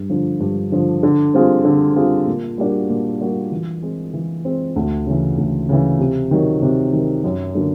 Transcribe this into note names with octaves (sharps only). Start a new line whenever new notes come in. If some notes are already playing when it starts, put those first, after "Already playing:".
Already playing: G2
D3 F3
G2
D3 F3
D3
G3 C4 F4 G#4
D3
G3 C4 F4 G#4
A#2
G3 A#3 D4 F#4
A#2
G3 A#3 D4 F#4
E3
G#3 C4
E3
G#3 C4
D2
C#3 E3
D2
C#3 E3
C3
D#3 F#3
C3
D#3 F#3
F#2
D3 F#3 A#3